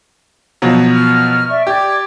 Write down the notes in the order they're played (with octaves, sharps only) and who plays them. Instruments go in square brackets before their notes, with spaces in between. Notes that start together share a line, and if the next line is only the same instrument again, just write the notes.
[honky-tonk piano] B2 F3 F#3
[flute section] F6
D5 E5 C#6
[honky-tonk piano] G4 [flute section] D5 D6 G#6